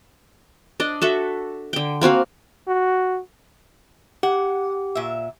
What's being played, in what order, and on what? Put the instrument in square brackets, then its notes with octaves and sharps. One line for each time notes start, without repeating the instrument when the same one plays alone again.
[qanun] D4 D5 D#5
F#4 A4 E5
D3 G5
A#3 C4 F#4 F5
[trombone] F#4
[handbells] G4 [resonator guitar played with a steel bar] F#5
[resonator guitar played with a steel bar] A#2 E5